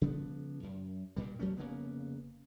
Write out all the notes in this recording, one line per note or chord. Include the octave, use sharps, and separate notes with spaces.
C#3 F3 G3 B3
F#2
G2 A#2 G3
E2 F#3 A3 C#4
F1 C#3 A#3 B3